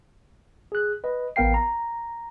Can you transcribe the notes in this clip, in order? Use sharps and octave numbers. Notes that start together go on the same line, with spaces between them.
G#4 F#6
B4 D#5
A1 B3 A#4 F5 G5 C7
A#5